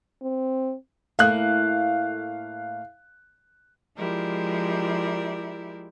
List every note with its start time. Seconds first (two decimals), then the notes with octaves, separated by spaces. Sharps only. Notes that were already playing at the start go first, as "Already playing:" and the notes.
0.22 C4
1.19 A2 A3 A#3 F5 F#6
3.96 F3 G#3 E4 G4 A#4 D5